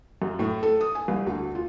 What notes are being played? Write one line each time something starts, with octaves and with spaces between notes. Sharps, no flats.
F#2
A2
A4
D#6
G#5
C2
D2
F4